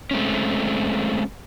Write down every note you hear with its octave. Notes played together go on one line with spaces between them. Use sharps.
G#3 A3 C4 C#4